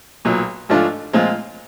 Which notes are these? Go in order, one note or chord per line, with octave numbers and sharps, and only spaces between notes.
B1 A#2 F#3
G#2 F3 A3 D4 F4
A#2 F3 G#3 C4 F4